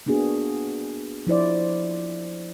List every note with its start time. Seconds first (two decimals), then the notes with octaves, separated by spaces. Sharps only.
0.06 A#3 B3 D4 F#4 G#4
1.27 F3 E4 C5 D5